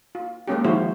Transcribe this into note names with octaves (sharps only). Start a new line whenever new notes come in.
F4
G#3 A#3 C#4 G4
D#3 F3 G#3 E4 F#4 C5